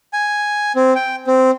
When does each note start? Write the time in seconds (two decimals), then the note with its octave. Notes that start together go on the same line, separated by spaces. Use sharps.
0.13 G#5
0.76 C4
0.96 G5
1.27 C4